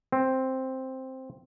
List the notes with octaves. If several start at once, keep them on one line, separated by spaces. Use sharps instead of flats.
C4